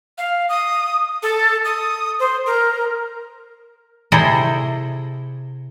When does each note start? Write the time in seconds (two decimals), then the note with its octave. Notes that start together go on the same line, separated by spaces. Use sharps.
0.18 F5
0.49 D#6
1.23 A4
1.65 D#6
2.19 C5
2.46 A#4
4.12 C3 E4 G#4 A4 C5 D#5